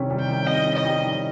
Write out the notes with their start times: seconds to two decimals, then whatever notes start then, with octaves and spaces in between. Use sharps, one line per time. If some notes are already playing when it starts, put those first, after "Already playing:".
Already playing: C3 D#3 G3 C#4
0.11 G3
0.20 G5
0.29 D#3
0.47 C3 D#5
0.67 C#4
0.75 D#5
0.85 G3
1.04 D#3